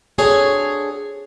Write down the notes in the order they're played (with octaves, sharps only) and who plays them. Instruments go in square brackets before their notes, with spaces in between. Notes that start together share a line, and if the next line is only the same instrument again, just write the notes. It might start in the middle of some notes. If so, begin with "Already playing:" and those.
[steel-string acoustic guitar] C4 D4 F#4 G#4 A4 C#5